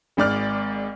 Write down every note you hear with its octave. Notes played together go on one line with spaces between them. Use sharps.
G#1 G#2 D5 F6